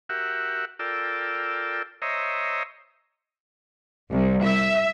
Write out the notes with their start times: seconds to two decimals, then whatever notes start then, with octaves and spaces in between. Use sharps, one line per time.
0.09 F#4 G4 A#4 E5 F#5
0.79 F4 A4 A#4 D5 G5 E6
2.02 C5 C#5 D#5 E5 A#5
4.12 C2
4.44 E5